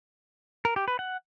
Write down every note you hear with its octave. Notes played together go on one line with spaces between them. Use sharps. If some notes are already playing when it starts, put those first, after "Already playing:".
A#4
G4
B4
F#5